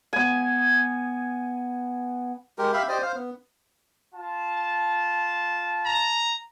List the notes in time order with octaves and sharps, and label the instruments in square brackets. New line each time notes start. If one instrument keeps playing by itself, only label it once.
[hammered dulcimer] B3 G#5
[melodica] G#3 G4 A#4
G4 E5 F5 B5
G4 C5 D5 D#5
C5 F5
B3
[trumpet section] F4 A5
[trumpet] A#5